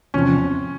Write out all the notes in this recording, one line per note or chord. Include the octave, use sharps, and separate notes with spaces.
E2 C3 F3 C#4